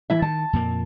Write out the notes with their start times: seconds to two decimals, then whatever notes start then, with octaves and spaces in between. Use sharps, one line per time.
0.10 E3 E4 E5
0.22 D#3 A5
0.53 F2 A#2 A#3